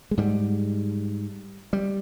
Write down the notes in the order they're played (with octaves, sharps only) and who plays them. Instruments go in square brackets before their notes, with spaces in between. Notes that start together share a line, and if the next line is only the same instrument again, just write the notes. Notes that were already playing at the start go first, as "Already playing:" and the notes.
[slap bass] G#3
G#2 G3
G3